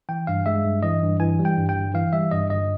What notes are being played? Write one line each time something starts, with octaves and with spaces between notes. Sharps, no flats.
E3 G5
G2 F5
G#3 E5
G2
E3 D#5
G2
E3 G#5
G3
G5
G2
G5
G1
E3 F5
G3 E5
G2 D#5
G1 D#5